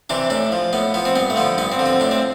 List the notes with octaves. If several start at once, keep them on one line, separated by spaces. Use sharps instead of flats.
C3 E3 D4
A2 D4
F3
A2 B3
F3 B3
C4
G2 B3
A3
D3 F3 B3
G2 B3
C4
D3 F3
C4
A2 D4
C4